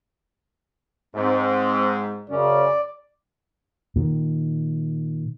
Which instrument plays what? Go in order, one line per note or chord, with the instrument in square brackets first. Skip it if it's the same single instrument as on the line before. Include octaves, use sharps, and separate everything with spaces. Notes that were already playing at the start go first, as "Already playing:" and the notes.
[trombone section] G#2 [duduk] C4
[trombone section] F#2 C#4 [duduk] C#3 [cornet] D5
[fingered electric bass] A#2 D#3